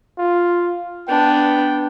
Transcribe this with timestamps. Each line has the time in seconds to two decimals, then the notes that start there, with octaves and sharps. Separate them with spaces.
0.18 F4
1.09 B3 D4 G5